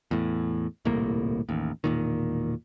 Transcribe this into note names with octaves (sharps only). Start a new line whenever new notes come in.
E2 A2
D#1 C2 A2 A#3
A1 D#2
E1 A#2 D#3